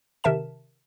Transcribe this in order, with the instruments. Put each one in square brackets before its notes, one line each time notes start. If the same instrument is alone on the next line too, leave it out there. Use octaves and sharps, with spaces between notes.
[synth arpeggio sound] C3 D#3 A#4 E5 A5 E7